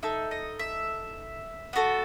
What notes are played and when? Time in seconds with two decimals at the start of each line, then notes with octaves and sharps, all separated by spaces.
0.03 D#4 A4 E5
0.31 D#5
0.59 E5
1.73 B3 F#4 A4